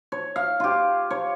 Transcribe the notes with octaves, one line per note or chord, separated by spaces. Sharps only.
C#5
F5
F4 G4
C#5